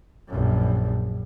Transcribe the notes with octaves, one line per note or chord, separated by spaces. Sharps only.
A#1 F#2